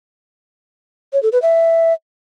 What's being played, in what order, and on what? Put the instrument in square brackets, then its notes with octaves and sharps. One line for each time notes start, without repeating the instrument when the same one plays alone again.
[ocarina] C#5
A4
B4
E5